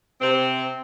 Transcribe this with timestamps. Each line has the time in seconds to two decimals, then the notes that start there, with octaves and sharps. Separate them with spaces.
0.20 C3 C4